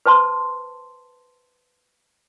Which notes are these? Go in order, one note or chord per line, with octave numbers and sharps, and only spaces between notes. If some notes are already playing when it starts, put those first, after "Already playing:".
B4 C5 A5 C6